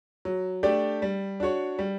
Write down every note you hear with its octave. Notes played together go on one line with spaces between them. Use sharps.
F#3
A3 D4 G4 D5
G3
D4 F#4 C#5
G3